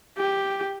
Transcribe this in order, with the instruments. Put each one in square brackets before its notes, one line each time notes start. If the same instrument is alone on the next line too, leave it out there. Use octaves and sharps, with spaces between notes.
[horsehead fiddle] G4